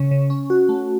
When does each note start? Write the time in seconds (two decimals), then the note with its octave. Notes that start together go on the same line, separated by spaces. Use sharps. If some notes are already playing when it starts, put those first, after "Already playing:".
Already playing: C#3 C#4
0.11 C#3
0.30 C#4
0.50 F#4
0.69 A3